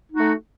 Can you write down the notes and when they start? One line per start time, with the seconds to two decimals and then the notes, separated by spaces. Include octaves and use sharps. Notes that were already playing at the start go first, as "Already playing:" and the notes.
0.12 D#4
0.15 F#4
0.19 A3